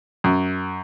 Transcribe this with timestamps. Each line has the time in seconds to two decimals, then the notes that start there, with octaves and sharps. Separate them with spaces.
0.24 F#2